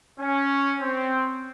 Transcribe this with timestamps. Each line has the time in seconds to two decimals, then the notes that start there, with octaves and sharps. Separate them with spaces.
0.20 C#4
0.80 C4